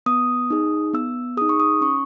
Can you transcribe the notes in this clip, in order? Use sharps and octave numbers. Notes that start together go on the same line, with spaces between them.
B3 D#6
D#4 G#4
B3 E6
D#4 G#4 D#6
C#6
D#6
C#4 C#6